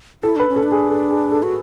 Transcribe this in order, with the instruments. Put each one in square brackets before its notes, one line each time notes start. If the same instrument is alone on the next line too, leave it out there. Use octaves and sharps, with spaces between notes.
[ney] E4 [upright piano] A4
[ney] D4 [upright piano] B4
[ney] C#4
[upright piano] A4
[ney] D4
[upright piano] G#4
A4
G#4
A4
[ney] F#4